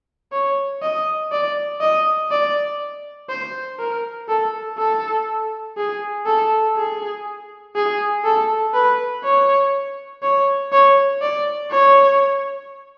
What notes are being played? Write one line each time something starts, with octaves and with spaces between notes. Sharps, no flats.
C#5
D#5
D5
D#5
D5
C5
A#4
A4
A4
G#4
A4
G#4
G#4
A4
B4
C#5
C#5
C#5
D5
C#5